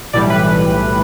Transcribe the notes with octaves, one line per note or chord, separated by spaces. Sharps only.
B1 A2 E3 G3 D5
B4